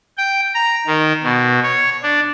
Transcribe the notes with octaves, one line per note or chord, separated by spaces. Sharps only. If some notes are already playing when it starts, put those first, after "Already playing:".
G5
A#5
D#3
B2
C#5
D4